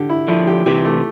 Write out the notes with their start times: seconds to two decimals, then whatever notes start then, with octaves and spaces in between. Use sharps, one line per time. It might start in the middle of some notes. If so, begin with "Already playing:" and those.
Already playing: D3 G4
0.09 E4
0.28 D3 F3 E4
0.47 G4
0.66 C3 E3 G4
0.85 A3